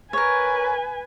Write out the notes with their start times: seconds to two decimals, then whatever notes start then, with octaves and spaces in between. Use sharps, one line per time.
0.13 A#4 B4 C#5 G#5